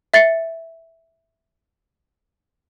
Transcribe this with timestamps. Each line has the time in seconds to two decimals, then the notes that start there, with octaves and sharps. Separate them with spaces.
0.14 E5 A6 C7 C#7